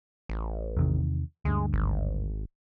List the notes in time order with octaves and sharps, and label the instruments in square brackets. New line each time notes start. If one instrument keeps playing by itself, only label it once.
[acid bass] A1
[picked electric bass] E2 C3 D#3
[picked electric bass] D2 G2 [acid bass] G#3
[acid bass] G#1